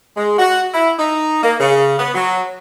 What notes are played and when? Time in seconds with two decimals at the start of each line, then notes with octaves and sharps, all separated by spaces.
0.17 G#3
0.39 F#4
0.74 E4
0.98 D#4
1.43 A#3
1.60 C#3
1.99 B3
2.14 F#3